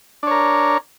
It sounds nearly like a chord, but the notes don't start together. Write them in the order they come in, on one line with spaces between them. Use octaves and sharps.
D4 C#5 A#4